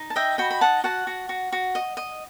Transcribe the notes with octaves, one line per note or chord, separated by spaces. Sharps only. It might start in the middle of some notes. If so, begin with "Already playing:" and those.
Already playing: D#4
A5
D#5 E5 G5
F#4 G5 B5
B5
D#4 F#5 A5
F#4 F#5 A5
F#4
F#4
F#4
D#5
D#5